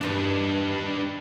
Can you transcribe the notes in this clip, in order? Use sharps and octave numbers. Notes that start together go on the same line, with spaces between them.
E2 G2 D#3 D4 B4